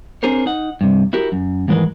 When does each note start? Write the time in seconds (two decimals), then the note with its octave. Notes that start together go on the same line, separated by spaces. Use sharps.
0.23 C4 D4 G#4 A#4 C5 C#5
0.46 D#4 F#5
0.81 G2 C3
1.13 E4 F#4 G4 A#4
1.32 F#2
1.68 D#2 G#2 E3 G#3 A#4 B4